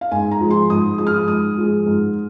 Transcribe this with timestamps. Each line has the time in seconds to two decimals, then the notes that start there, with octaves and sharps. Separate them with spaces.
0.01 F5
0.11 G#2 G#5
0.31 A#5
0.41 F3 G#3
0.50 C6
0.70 G#2 D#6
0.98 F3 G#3 D#6
1.07 F6
1.14 D#6
1.28 G#2 D#6
1.57 F3 G#3
1.86 G#2